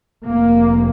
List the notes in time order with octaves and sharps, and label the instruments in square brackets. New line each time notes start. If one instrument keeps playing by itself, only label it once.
[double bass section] F1 F2 C3 A#3